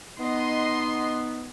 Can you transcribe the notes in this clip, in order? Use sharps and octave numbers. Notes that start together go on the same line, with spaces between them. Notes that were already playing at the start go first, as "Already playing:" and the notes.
B3 D#4 D#5 C6